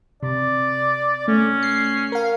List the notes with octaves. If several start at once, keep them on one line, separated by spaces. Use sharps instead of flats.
C3 D5
A3 C#4
C7
A#4 F5